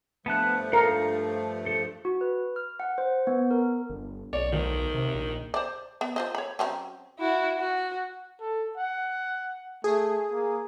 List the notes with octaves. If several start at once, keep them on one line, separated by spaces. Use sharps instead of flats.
G2 F3 A3 B3 A5 F#6
A4 A#4 F5
A4
F#4
B4
F6
F#5
C5
B3
A#4
G1
B1 C#5 D5
D2 D#3
C3
A#1
C5 D5
B3
F4 C5 D#5
C#5 B5
F#3 C4 C#4
E4 F#4
F#4
A4
F#5
A3 G#4
A#3